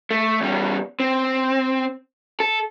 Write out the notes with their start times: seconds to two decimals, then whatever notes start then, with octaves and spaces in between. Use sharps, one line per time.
0.11 A3
0.41 E2 G3
1.00 C4
2.40 A4